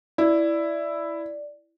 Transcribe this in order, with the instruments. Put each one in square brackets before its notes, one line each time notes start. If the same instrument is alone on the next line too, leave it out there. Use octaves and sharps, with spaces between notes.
[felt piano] E4 [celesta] D5